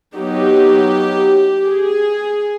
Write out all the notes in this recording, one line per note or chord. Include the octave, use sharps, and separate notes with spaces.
F#3 B3 D#4 G4
G#4